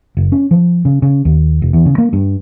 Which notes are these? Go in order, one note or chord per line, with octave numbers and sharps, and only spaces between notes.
F#1
C#4
F3
C#3
C#3
D#2
F1
E2
C#3
A#3
G2